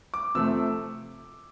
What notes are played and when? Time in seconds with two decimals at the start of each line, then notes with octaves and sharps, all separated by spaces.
0.14 D6
0.35 C3 F3 A3 E6